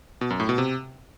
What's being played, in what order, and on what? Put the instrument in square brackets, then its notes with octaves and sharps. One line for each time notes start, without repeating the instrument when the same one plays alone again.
[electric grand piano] B2
F#2
A2
B2
C3